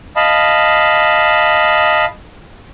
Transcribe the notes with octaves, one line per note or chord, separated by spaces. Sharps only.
D#5 F5 A5 B5